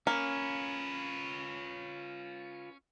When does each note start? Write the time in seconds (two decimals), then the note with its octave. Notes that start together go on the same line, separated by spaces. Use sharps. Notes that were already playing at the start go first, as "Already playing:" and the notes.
0.07 A#3 C#4 F4 B4